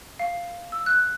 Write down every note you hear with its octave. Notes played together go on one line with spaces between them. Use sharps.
F5
E6
F#6